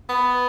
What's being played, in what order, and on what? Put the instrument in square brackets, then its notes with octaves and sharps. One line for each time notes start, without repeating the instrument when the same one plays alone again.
[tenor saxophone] B3